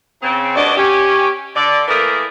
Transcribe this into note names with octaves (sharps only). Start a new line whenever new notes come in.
C#3 C4
D2 G2 D4 F#4 D5 D#5
C#4 G4
D3 D5
E3 A3 A#3 G#4 A#4